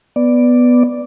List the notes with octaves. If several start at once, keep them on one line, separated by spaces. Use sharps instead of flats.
B3 D5